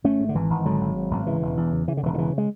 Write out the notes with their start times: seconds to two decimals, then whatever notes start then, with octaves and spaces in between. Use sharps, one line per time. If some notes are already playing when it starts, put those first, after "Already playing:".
0.04 G#1 A3 C#4
0.20 G#2
0.29 D3
0.35 G#1 E3
0.50 G#1
0.66 G#2 D3 F#3
0.81 G#1
0.96 G#2
1.11 G#1
1.27 C#3 E3
1.42 E1
1.57 E2
1.72 C#3
1.88 C#3 E3
1.97 D3
2.03 E1 E3
2.14 D3
2.18 C#3 E3
2.38 G#3